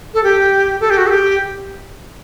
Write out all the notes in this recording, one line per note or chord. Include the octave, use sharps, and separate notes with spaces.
A4
G4
A4
G4
F#4
A4
G4